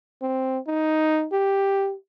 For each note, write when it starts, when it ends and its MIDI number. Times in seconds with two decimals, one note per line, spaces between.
0.22 0.59 60
0.67 1.27 63
1.32 1.95 67